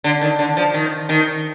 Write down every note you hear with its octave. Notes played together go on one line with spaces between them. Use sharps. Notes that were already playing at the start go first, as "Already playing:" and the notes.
D3
D#3
D3
F3
D#3
D#3